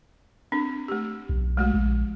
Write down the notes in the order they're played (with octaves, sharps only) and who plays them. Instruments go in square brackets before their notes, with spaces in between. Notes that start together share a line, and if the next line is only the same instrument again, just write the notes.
[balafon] C4 D4
A3 G4
[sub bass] B1
[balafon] G#3 A3 F#4
[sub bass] A#1